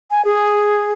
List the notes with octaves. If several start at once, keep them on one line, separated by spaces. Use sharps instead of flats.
G#5
G#4